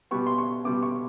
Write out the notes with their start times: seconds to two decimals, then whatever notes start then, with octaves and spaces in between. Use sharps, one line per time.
0.11 B2 G3 B3 C#6
0.27 C6
0.38 C#6
0.64 B2 G3 B3 D6
0.83 C#6